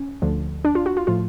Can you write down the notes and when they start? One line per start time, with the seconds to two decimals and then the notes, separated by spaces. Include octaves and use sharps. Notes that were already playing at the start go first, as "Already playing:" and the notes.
Already playing: C#4
0.22 D2 D3 F3
0.65 D4
0.75 F4
0.86 F#4
0.97 F4
1.07 A2 F3 F4